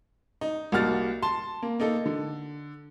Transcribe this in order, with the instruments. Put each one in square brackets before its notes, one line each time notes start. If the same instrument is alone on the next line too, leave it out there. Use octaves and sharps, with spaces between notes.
[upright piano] D#4
C2 A#3 F#4 F6 A6
A5 C6
A#3
A#3 D#4 A4
D3